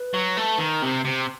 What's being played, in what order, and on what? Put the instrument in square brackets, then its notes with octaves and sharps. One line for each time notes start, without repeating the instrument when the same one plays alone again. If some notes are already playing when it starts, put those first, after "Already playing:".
Already playing: [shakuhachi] B4
[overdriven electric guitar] F#3
A3
D#3
[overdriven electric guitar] C3 [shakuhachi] C5
[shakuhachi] B4
[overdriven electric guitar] C3 [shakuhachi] C5